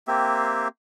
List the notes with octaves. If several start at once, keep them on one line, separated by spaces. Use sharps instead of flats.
A#3 C4 G4 E5